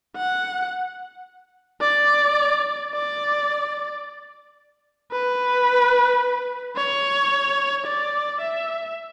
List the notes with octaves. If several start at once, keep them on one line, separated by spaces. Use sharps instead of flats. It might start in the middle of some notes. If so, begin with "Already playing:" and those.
F#5
D5
D5
B4
C#5
D5
E5